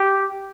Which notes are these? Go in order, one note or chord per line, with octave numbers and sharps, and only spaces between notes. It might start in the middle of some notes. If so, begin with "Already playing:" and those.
Already playing: G4